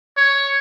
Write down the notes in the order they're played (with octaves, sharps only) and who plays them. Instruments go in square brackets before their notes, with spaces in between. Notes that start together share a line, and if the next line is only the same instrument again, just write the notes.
[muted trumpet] C#5